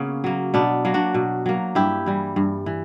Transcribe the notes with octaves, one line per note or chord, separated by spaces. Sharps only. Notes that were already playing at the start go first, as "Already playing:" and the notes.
Already playing: C#3 A#3 B3 C#4
F#3 A#3
B2 B3 D4
F#3 A#3
D4 F#4
B2
F#3 A#3
G2 E4 G4
E3 G3
G2
E3